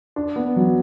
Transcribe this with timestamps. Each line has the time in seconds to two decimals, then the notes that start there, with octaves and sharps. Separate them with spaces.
0.16 D4
0.36 B3
0.56 F#3